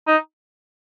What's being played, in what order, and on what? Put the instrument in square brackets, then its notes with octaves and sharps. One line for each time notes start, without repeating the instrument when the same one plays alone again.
[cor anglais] D#4